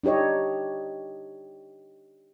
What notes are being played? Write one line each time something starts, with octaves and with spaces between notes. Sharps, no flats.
D4 D#4 G4 C#5 D#5